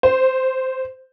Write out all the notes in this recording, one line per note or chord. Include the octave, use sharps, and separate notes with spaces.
C5